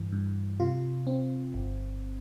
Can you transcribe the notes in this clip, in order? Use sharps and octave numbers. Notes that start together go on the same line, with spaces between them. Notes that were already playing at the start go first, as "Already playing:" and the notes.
Already playing: G2 E3
G2
C3 F4
C4
G1